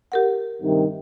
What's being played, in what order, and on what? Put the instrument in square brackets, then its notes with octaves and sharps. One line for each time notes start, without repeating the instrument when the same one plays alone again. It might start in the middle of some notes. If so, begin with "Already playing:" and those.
[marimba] G4 A#4 F#5
[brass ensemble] G2 C3 D#3